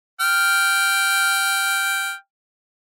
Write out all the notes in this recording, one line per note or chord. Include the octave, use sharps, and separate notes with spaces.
G5 F6